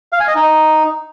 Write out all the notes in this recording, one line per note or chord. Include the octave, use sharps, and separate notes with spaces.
F5
G#5
D#5
D#4